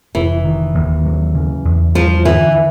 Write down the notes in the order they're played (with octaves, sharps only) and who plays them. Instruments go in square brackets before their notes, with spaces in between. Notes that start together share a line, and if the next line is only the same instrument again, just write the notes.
[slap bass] F1 [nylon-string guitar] E3
[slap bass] D#3
D#2
F#3
C#3
E2
[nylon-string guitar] F3 [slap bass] G3
[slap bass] D3 [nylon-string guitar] E3